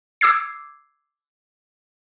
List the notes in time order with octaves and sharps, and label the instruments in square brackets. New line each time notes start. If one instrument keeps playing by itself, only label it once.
[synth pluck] D6 E6 G#6 C7